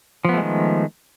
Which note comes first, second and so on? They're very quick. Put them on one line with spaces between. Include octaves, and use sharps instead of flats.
F3 B3 A3 G#3 D#3